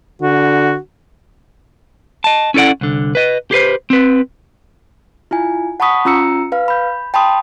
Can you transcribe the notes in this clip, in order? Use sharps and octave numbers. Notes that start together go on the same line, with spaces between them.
D3 F#4
D#5 A5
C#4 E4 A4 D5 F#5
C2 D3
B4 D#5
G4 G#4 B4 C5
C4 B4
E4 F4 G#5
F#5 A5 B5 C#6 D#6 B6
C#4 F4 A#5 E6 C#7
B4 F5
B5 G6
G5 A5 B5 C6 D#6